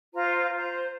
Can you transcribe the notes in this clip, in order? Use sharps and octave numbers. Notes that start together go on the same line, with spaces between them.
F4 C5 A#5
F4 C5 A#5